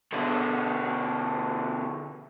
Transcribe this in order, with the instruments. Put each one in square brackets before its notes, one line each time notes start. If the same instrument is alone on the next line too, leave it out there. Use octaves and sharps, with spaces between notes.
[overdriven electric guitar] B2 D3